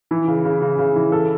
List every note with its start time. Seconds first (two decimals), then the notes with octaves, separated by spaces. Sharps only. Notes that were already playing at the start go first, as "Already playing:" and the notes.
0.11 E3
0.28 C#3
0.45 C#3
0.62 C#3
0.79 C#3
0.96 E3
1.12 A4